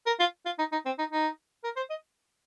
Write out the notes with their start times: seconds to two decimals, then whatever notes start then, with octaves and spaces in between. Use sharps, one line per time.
0.06 A#4
0.20 F4
0.45 F4
0.59 D#4
0.72 D#4
0.86 C4
0.99 D#4
1.11 D#4
1.64 A#4
1.76 C5
1.90 D#5